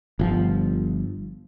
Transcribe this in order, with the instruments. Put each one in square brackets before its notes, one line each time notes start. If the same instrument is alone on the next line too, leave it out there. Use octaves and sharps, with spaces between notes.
[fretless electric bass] G1 F3